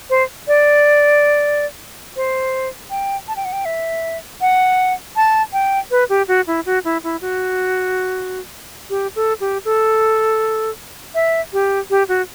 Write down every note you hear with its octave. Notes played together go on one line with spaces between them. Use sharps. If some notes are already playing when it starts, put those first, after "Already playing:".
C5
D5
C5
G5
A5
G5
F#5
G5
E5
F#5
A5
G5
B4
G4
F#4
E4
F#4
E4
E4
F#4
G4
A4
G4
A4
E5
G4
G4
F#4